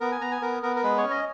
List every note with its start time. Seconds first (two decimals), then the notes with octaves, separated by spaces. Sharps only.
0.01 B3 A#4
0.12 G#5
0.21 B3 A#5
0.32 G#5
0.42 B3 A#4
0.63 B3 A#4
0.76 A#4
0.83 G#3 B4
0.98 C#5
1.03 C#4
1.10 D#5